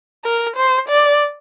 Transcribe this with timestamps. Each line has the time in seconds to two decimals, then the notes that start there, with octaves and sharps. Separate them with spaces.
0.24 A#4
0.56 C5
0.89 D5